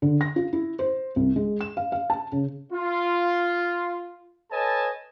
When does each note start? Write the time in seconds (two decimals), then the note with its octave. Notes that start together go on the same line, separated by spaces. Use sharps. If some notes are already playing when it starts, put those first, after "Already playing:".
0.02 D3
0.21 A#6
0.36 F4
0.53 E4
0.79 C5
1.16 C2
1.36 G#3
1.61 E7
1.77 F5
1.92 F5
2.10 A5
2.32 C#3
2.72 F4
4.52 A4 B4 C#5 D#5 G#5 A5